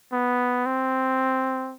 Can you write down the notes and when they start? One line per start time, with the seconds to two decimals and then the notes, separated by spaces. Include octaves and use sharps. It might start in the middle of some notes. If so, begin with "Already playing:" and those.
0.13 B3
0.66 C4